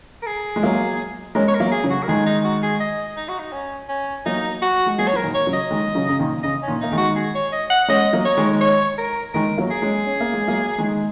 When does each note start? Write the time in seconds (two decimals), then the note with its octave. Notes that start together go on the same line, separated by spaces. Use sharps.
0.23 A#4
0.27 G#4
0.56 G#3
0.63 F#3 A#3
1.35 G#3 C#4 A#4
1.48 C#5
1.54 A#4
1.60 F#3 A#3
1.71 G#4
1.84 C#3 F#3
1.90 F#4
2.03 A#4
2.08 D#3 G#3 G#4
2.26 D#4
2.44 F#4
2.62 G#4
2.80 D#5
3.17 D#4
3.28 F#4
3.39 D#4
3.53 C#4
3.89 C#4
4.26 F#3 A#3 D#4
4.62 F#4
4.86 G#3
4.98 F#3 A#3 G#4
5.08 C#5
5.13 F#3 A#4
5.22 A#2 D#3
5.34 C#5
5.47 C#3 F#3
5.53 D#5
5.71 D#3 G#3
5.95 C#3 F#3
6.09 C#3
6.19 A#2 D#3
6.43 C#3 D#5
6.62 C#4
6.67 A#2 D#3
6.80 A#3 D#4
6.92 D#3 G#3
6.97 F#4
7.16 G#4
7.35 C#5
7.52 D#5
7.70 F#5
7.88 G#3 C#4 D#5
8.13 F#3 A#3
8.25 C#5
8.37 D#3 G#3
8.61 C#5
8.98 A#4
9.33 D#3 G#3 A#4
9.57 F#3 A#3
9.70 G#4
9.82 G#3 C#4
10.06 C#4
10.20 A#3
10.34 G#3
10.48 F#3 A#3
10.78 D#3 G#3